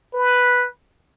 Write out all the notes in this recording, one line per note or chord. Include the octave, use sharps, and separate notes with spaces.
B4